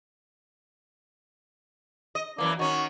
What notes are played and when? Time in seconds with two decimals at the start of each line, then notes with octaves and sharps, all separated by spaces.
2.15 D#5
2.38 F#2 E3 A#3 D4
2.59 D#3 C#4 F#4